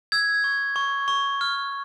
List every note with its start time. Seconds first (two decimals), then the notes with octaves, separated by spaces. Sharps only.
0.12 E6 G#6
0.44 C#6
0.76 C#6
1.08 C#6
1.41 F6